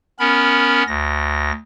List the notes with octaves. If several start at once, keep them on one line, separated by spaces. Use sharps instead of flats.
B3 C#4 A#4 B5
D2 A#6